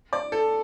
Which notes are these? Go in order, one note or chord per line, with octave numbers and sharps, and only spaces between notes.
D5
A4